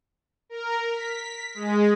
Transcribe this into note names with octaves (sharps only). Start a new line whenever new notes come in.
A#4
B6
G#3